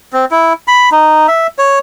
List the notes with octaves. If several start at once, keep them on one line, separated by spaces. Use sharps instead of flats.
C4
E4
B5
D#4
E5
C#5